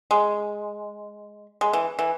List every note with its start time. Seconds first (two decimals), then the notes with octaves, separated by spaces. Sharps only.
0.11 G#3
1.61 G#3
1.73 E3
1.99 E3